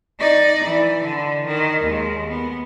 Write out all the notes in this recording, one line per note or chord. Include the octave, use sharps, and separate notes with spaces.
D#4 D5
E3
D3
D#3
D#2 G#3
B3